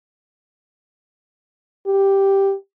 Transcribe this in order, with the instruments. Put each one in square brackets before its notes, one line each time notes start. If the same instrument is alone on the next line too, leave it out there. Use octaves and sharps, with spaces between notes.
[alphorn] G4